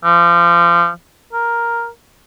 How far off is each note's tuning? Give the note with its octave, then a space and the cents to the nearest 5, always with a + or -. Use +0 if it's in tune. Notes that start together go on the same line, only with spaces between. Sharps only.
F3 -30
A#4 +5